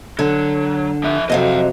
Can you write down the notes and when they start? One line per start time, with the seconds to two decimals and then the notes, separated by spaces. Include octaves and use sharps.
0.19 D3 F#3
1.04 F3 E5
1.30 F2 C3 F#3 D#5 F5